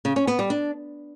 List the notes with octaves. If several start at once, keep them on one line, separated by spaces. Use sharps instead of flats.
C#3
C#4
B3
G3
D4